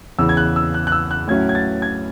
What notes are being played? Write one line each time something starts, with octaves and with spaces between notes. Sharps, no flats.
E2 C#3 E3 E6
G#6
F#6
E6
F#6
F#6
E6
F#6
A2 F#3 C#4 E4 G#6
G#6
A6
G#6